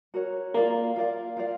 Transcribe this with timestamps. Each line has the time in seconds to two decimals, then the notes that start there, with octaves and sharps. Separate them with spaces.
0.14 F#4 A#4 C#5
0.54 A#3 F4 A#4 D5 F5
0.96 F4 A#4 D5 F5
1.37 F4 A#4 D5 F5